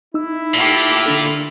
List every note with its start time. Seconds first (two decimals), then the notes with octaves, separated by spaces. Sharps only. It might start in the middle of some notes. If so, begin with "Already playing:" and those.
0.14 D#4 E4 E6
0.54 A#2 A3 G4 D6
1.06 D3 D4 A4